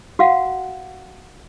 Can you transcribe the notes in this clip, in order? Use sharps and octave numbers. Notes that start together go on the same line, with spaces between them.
F#4 F5 F#5